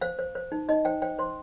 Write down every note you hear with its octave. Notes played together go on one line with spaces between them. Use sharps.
C5 F5
C5
C5
D#4
D#4 D#5
C5 G5
C5 G5
C5 C6